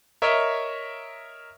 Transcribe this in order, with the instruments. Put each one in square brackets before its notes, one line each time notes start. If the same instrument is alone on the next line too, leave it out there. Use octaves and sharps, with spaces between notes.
[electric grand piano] A#4 C#5 D#5 E5